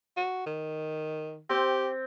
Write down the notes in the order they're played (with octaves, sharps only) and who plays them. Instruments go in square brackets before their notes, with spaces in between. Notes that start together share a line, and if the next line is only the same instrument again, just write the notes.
[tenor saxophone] F#4
D#3
[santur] C4 [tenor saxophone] G4